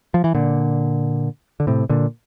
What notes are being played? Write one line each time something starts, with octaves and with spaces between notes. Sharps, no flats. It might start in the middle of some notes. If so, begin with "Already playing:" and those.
F3
E3
A#2 D3
D3
A2 C3
A#2 D3